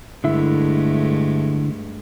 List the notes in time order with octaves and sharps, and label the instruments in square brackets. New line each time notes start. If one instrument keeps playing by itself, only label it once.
[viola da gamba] G2 G#3 A3 [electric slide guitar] D3 E4 E5